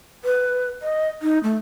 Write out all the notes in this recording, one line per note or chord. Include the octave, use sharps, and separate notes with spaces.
B4
D#5
D#4
A3